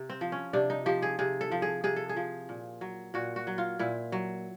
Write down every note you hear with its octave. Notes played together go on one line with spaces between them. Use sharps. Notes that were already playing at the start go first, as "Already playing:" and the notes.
Already playing: C3
C4
F3
C#4
C3 D4
D#4
F3 G4
G#4
C3 G#4
A4
F3
G#4
C3 G#4
A4
G#4
F3
A#2
F#3
A#2 F#4
F#4
F#3
F4
A#2 E4
F#3